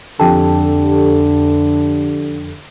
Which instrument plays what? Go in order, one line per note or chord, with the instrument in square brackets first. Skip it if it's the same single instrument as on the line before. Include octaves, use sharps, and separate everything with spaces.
[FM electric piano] F2 G4 A4 [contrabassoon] D3